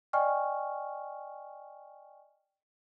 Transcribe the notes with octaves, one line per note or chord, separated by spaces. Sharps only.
D5 D#5 G5 G#5 C#6 F6